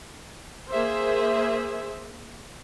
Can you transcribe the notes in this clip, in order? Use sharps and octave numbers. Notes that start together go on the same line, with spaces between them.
A#3 G#4 C5 E5